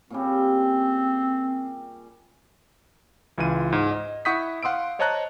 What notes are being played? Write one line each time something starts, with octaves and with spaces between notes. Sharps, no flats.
A#2 C#3 G3 C4
C#2 E3 F4 D#7
G#2
D#5
E4 F#5 C#6 D#6 G6 B6
F5 F#5 C6 D#6 E6 D7
C5 C#5 D#5 A5 A#5 F#6